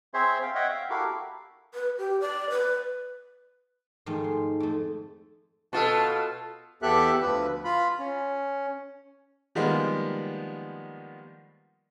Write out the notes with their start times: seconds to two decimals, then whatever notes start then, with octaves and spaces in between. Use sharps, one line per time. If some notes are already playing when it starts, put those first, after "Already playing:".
0.14 C4 G#4 C5 C#5 E5 C6
0.42 F5 G5
0.55 C#5 D#5 E5 F#5 G5
0.69 E5 F5
0.90 E4 F#4 G4 A4 A#4 F5
1.74 B4
1.98 G4
2.21 D5
2.50 B4
4.06 G#2 D#3 F3 A3
4.24 C6
4.60 F2 A3
5.73 B2 F4 A4 D#5 A5 C#6
6.82 E2 B3 G4 A4 E5 F#6
7.21 D2 F3 B4
7.64 F4 B5
7.99 C#4
9.55 D#3 F3 G3 G#3 A#3 B3